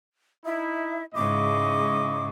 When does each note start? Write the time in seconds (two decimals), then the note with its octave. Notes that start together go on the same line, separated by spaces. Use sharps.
0.45 D#4 E4 E5
1.15 G#2 C#3 E4 D#5 C#6 D6